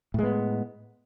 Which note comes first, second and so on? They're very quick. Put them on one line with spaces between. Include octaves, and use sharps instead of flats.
A2 G#3 B3